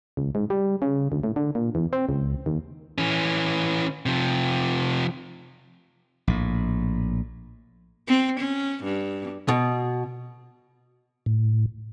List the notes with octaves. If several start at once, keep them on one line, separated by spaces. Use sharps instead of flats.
C#2
G#2
G3
C#3
D2
A2
D3
A#2
E2
C4
C#2
D#2
E3 C#4
C3 F3
A#1 A2
C4
C#4
G2
B2
A2